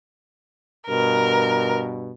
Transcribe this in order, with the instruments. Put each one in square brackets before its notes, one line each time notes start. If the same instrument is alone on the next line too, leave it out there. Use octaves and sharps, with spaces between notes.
[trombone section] G2 B2 [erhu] A#4